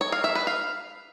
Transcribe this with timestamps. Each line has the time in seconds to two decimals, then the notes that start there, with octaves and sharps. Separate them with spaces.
0.01 C#5
0.12 F5
0.24 E5
0.35 B4
0.47 F5